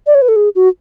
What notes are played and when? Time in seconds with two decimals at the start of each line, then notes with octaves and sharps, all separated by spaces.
0.07 D5
0.15 C#5
0.22 B4
0.28 A4
0.36 G#4
0.55 F#4